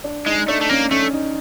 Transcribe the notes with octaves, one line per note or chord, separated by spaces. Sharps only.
D4
G#3 D#4
A3 D4
A3
A#3 C#4
A3 C#4
D#4